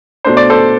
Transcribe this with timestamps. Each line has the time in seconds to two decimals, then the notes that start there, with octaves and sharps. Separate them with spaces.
0.25 B2 A3 D4 C5
0.37 D5
0.50 A4 C5